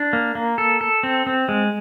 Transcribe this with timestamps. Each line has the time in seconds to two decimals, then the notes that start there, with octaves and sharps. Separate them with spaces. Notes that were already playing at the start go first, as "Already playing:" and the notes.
Already playing: D4
0.13 A#3
0.35 A#3
0.58 A4
0.81 A4
1.03 C4
1.27 C4
1.49 G#3